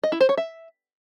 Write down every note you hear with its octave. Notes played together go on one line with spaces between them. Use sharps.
D#5
E4
C5
C#5
E5